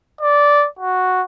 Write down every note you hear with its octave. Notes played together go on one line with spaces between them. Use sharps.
D5
F#4